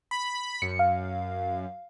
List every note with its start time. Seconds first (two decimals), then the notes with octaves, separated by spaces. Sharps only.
0.11 B5
0.62 F#2 C#7
0.79 F5